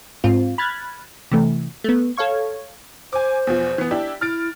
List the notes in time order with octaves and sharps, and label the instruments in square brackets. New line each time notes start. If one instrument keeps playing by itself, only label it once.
[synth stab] G#2 C4 F4
B5 F6 F#6 G#6 A6
C3 E3 A3
A3 B3
A4 C#5 F5 C#6 G#6
[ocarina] C5 [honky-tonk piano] G#5 D6
[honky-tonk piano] E2 B2 F3
E3 B3
D4 E4 G4
[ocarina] E4 [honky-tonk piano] F6 A6 D7